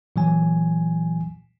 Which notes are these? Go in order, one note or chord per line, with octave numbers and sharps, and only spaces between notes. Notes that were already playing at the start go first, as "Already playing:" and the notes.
A#2 E3 F#3 G#5